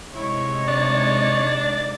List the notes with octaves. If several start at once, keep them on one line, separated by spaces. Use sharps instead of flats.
C3 G#3 D#4 E4 C#5
D4 D5 A6